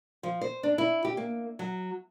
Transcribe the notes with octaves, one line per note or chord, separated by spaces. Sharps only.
F3
C5
D4
E4
G4
A#3
F#3